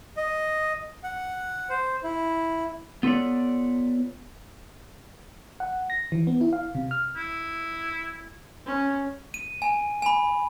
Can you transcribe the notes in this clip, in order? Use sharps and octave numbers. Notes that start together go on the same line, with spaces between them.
D#5
F#5
C5
E4
B3 F4 A4 B4 C#5 D5
F#5
A#6
E3
B3
E4
F5
C3
F6
E4
C#4
D#7
G#5
G#5 B5